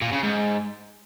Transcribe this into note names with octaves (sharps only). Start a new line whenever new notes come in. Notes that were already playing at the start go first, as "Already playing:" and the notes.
A#2
C#3
G#2